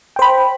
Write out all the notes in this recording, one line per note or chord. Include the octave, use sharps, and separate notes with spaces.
C5 G5 B5